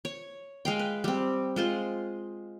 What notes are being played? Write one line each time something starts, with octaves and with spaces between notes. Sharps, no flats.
C#5
G#3 F5 G5
B4
G3 C4
G#3 F4 C5